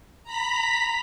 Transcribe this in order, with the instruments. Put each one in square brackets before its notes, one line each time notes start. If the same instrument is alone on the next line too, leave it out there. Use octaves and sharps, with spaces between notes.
[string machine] A#5 B5 B6